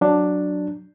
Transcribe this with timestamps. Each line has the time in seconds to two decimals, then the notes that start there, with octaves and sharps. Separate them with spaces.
0.01 F#3 D4